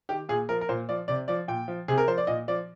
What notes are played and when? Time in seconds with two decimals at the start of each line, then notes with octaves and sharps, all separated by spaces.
0.09 D#3 G4
0.29 A#2 G#4
0.49 F3 A#4
0.61 A#4
0.69 A#2 C5
0.89 F3 D5
1.08 C3 D5
1.28 F3 D5
1.48 A#2 G5
1.68 F3
1.88 C3 G#4
1.98 A#4
2.08 F3 C5
2.18 D5
2.27 A#2 D#5
2.48 F3 D5